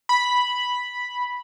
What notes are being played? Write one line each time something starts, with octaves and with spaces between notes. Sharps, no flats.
B5